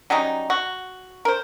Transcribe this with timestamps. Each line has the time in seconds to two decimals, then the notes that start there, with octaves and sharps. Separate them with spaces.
0.10 F#3 G3 C#4 D#4
0.50 F#4
1.25 A#4 C5